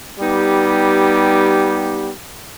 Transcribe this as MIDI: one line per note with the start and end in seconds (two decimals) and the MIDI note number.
0.20 2.11 55
0.20 2.11 59
0.20 2.11 63
0.20 2.11 67